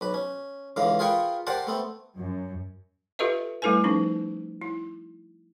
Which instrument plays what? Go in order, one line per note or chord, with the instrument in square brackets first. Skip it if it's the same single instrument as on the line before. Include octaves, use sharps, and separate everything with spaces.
[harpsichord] B1 B4
C#4
C#2 D3 E3 F5
F4 G#4 A#4 B4 G5 C#6
G4 A#4 C5 D5 F#5 A5
A3 B3 C4
[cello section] F#2
[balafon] F4 G4 A4 B4 D#5 E5
G3 A3 E4 A4 B4 G#5
F3 C#4 D#4
E4